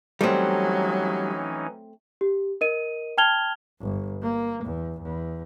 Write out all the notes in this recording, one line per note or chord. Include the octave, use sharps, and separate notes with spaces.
E3 F#3 G3 A3 C4 C#4 D#4
G4
A#4 D#5 D#7
G5 A5 F6 G#6 F7 G7
G1
A#3
E2
E2